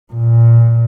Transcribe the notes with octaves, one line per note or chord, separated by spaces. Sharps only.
A#2